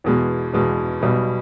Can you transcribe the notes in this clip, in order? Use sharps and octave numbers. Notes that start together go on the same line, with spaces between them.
E2 B2 G#3
E2 B2 G#3
B1 B2 G3